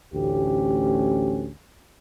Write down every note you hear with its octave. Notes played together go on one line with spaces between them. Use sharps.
A1 D2 C#4 G4